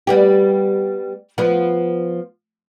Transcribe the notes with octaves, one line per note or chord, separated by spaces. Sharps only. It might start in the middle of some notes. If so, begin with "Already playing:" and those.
G3 B3 G4
F3 B3